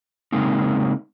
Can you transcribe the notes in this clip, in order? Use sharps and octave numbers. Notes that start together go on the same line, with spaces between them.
C#3 G#3 A#3 C4 D#4